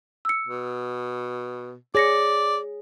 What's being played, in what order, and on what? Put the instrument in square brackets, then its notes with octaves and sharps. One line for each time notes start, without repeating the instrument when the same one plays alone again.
[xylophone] E6 C#7
[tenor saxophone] B2
[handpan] G#4 [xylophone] C#5 A#6 C#7 [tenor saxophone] D5